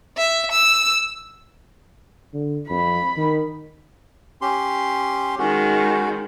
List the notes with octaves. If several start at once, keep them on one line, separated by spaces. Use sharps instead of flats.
E5
E6
D3
F2 B5
D#3
C#4 G4 C6
D#3 G#3 C#4 F#4